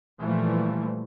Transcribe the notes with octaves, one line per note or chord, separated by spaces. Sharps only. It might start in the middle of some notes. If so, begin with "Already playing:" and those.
A#2 E3 F3 G3 A3